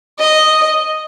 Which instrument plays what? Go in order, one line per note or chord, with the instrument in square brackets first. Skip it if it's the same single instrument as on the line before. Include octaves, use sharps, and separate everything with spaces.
[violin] D#5